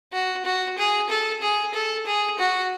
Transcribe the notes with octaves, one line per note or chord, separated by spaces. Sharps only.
F#4
F#4
G#4
A4
G#4
A4
G#4
F#4